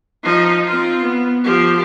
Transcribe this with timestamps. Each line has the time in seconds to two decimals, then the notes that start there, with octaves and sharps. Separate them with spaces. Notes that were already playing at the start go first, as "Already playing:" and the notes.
0.23 F3 D#4
0.67 C4 F4
1.03 B3
1.44 F3 G4